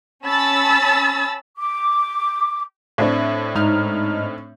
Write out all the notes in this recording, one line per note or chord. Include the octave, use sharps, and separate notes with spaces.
C#4 A5 B5 E6 A6
D6
A2 C4 D4
G#2 D#4 F6